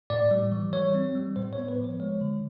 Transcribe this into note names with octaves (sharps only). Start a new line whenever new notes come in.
A2 D5
G3
E3
G3 C#5
C4
G3
A2 C5
C#5
B3
B4
F3
C5
G#3 C#5
D3